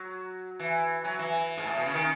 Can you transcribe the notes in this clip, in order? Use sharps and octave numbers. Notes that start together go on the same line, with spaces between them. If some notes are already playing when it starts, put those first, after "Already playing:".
Already playing: F#3
E3
F#3
E3
G#2
A2
B2
C#3
D#3